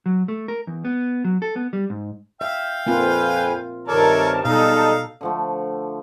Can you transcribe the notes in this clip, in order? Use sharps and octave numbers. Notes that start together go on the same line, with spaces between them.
F#3
A3
A#4
E2
B3
F#3
A4
B3
G3
G#2
E5 F5 G5
F2 A#3 C4 F4 B4 G#5
G2 C3 D#3 A4 A#4 C#5 D5 A5
B2 G3 G#3 D#4 A4 F5
D3 F3 A3